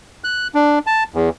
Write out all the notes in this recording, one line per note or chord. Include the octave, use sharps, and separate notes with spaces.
F#6
D4
A5
E2